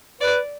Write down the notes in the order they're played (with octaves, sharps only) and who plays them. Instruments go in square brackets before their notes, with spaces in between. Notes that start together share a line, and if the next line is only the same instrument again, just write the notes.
[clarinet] B4 [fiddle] D5